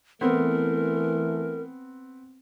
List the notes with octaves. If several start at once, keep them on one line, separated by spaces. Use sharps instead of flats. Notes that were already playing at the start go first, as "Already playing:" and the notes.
E3 A3 B3 C4 A#4